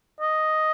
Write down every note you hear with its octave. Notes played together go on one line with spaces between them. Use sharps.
D#5